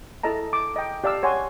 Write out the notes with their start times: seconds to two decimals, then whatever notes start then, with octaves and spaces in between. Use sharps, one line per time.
0.23 E4 A4 D#5 A5 A#5
0.53 D6
0.76 D#5 G5
1.04 G4 D5 F5 A5 E6
1.23 C#5 F#5 G#5 C6